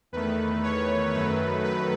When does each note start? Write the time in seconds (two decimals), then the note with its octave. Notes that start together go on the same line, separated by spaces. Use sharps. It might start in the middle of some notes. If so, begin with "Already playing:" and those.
0.12 E2 D#3 A3 B4
0.63 C#5
1.14 F#2 D#3 F#3 A3 B4
1.64 B4